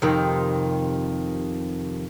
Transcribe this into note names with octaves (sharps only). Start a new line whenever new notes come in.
F2 C3 D#3